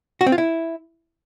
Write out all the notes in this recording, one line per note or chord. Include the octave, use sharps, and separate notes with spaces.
F#4
C4
F4
E4